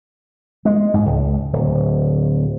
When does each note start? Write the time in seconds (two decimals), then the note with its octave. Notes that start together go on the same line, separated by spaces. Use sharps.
0.65 G#3
0.94 G#2
1.06 C#2
1.53 D1